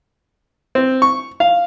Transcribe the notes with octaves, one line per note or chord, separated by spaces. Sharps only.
C4
C#6
F5